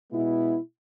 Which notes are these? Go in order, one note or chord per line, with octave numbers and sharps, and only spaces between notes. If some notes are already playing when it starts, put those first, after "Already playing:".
B2 G#3 B3 E4